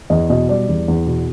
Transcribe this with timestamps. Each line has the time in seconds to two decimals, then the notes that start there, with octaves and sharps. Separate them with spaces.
0.10 E2 D#5
0.30 B2 D#5
0.49 G3 D5
0.68 E2
0.88 E2
1.06 B2